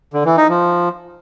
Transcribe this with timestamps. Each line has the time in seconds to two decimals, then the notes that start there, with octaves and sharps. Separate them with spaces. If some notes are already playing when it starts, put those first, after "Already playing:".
0.13 D3
0.25 E3
0.37 D#4
0.49 F3